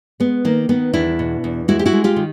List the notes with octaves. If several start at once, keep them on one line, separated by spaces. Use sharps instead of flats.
G#3 B3
D#3 A#3
D#3 B3
E2 D4 E4
B2
E2
G#3 E4 F#4
G4
E4 F#4
G#3
F4 G4
D#3